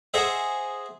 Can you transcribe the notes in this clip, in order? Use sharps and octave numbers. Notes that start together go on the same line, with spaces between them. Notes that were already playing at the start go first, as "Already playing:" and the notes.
G#4 C5 D#5 E5 F#5